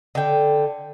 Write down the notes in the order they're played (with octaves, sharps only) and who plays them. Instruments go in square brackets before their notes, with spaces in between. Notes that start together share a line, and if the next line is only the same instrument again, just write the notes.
[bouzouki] D3 G5